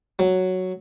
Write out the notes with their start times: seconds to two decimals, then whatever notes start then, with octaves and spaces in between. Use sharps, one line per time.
0.19 F#3